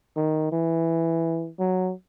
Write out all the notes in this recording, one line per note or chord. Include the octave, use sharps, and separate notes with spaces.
D#3
E3
F#3